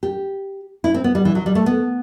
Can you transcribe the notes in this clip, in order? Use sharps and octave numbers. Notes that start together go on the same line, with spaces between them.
G4
E4
C4
B3
G3
E3
F#3
G3
A3
B3